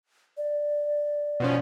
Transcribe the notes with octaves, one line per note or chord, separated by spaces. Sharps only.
D5
B2 F3 C#4